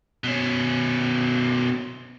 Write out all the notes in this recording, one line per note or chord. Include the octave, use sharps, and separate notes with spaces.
B2 C#4